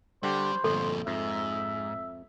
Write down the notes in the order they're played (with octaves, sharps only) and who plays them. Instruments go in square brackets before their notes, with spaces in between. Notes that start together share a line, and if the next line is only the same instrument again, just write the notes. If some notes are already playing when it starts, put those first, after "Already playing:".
[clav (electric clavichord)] D3 D4 G4 [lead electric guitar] G3 [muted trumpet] C5
[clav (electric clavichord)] G1 [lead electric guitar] F2 A#2 [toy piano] A4
[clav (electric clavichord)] F2 [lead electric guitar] G#2 [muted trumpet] E5